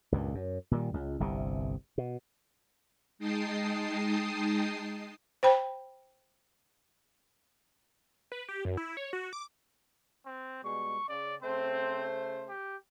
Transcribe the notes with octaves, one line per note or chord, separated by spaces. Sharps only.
C#2 G2 A#2
F#2
A#2 D#3 G3
C#2
G1 C2 C3
B2
G#3 D#4 G5 A5 D#6 C7
C5 G5 B5
B4
G4
F#2
E4
C#5
F#4
D6
C4
B2 G3 G#3 C#6
C#3 D5
C#3 A3 C4 C5
G4